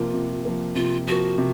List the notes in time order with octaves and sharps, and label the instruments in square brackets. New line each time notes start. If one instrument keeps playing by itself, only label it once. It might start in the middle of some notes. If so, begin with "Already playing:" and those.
Already playing: [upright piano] C3 F3 A#3 [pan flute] F4
[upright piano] C3
F3 A#3
[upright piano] C3 [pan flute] F4
[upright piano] F3 A#3 [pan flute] F#4
[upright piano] C3